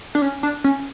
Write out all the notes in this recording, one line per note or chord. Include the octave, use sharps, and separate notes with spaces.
D4
C#4
D4
C#4